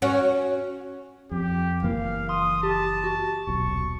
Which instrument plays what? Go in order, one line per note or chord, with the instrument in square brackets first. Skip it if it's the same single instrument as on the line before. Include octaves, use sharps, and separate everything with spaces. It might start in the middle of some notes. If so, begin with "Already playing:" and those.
[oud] C#4 F#4
[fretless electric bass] F2 [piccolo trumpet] G4
[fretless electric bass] F#1 E3 A#3 [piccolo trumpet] F5
[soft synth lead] C6 [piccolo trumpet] D#6
[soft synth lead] G4 [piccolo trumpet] A5
[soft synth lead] F#4
[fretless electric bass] D#1 B1 [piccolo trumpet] C#6